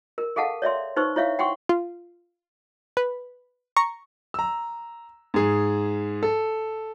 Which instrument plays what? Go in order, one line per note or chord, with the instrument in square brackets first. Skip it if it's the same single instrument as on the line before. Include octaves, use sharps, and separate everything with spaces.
[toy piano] A#4
G#4 A4 F5 F#5 A5
C#5 D5 E5 C6
D#4 B4 C5 C#6
E4 C#5 E5 F5
F#5 G5 C6 C#6
[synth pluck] F4
B4
A#5 C#6
[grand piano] A#5 E6
G#2 G#4
A4